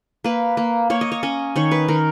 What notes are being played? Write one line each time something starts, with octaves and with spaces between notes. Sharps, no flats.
A#3 B4
A#3
A#3 C#5
D#5
C#5
C#4 D#5
D#3 C#5
B4
D#3 A#4